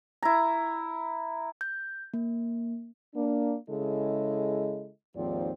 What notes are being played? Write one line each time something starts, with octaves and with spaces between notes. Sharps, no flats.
E4 A#5
G6
A#3
A#3 D4
C#3 G#3 E4 A4 D#5
D#2 G#2 F3 C4 D5